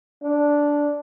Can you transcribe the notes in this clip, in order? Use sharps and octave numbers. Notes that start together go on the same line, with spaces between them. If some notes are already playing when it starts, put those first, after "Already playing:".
D4